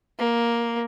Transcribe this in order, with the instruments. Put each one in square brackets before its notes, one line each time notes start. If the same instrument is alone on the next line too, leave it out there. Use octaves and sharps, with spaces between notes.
[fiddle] A#3